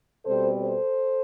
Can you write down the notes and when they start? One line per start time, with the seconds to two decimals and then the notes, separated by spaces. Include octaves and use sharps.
0.25 B2 G3 C4 A4 C5
0.61 A4 C5